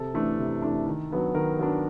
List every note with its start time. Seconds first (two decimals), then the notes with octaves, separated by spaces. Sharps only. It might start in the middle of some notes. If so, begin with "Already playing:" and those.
Already playing: C3 A4
0.14 E3 A3 D4
0.39 C3
0.62 E3 A3 D4
0.86 D#3
1.11 F#3 B3 D4
1.35 D#3 A#4
1.59 F#3 B3 D4